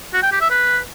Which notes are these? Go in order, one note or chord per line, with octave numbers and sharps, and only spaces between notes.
F#4
G5
G4
E5
B4